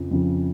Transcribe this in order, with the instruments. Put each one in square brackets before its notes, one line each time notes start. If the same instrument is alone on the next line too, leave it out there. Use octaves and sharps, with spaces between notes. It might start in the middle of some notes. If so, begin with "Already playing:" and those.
Already playing: [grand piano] F2 C#3 F3
F2 C#3 F3